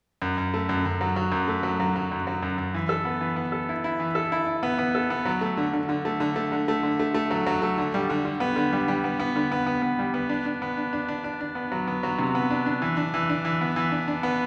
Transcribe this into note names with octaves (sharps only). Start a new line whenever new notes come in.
F#2
F#2
A3
F#2
F#2
F#3
F#3
F#2
A3
F#3
F#3
F#3
F#2
F#3
F#2
F#2
E3
A4
B3
E3
B3
A4
E4
E4
E3
A4
E4
E4
B3
B3
A4
B3
F#3
A3
D3
D3
D3
A3
D3
A3
D3
A3
D3
A3
A3
F#3
F#3
A3
D3
G3
D3
D3
B3
D3
G3
G3
B3
B3
D3
B3
B3
B3
G3
B3
D4
D4
B3
D4
D4
D4
D4
D4
B3
F#3
B3
F#3
C3
B3
D4
D4
E3
D4
E3
D4
E3
B3
E3
D4
D4
B3